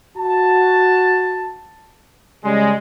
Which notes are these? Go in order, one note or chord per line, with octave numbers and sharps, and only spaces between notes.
F#4 A5
C#3 G3 G#3